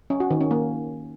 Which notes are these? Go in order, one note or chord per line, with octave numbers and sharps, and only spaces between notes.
C#4
F#4
D#3
C#4
A#3